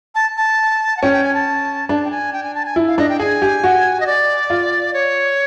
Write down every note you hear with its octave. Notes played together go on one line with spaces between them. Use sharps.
A5
A5
F#5
C#4 G5
G5
G#5
A5
D4 A5
G5
G#5
G5
G#5
A5
G#5
E4
F5
D4 D#5
G5
G#4 G#5
G4
F#4
D#5
D5
F4
C#5